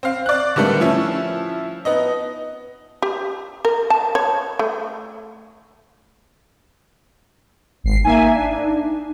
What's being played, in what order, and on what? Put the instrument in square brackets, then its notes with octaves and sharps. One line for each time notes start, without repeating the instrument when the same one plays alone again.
[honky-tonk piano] C4 F5
D5 F#6
D3 D#3 G3 A3 B3
F3 C#4 E4
B3 D#4 D#5
[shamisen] G4
A#4
A5
C#5
A3
[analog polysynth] G#1 C7
[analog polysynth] A#3 E5 G#5 [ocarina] D#4
[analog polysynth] D4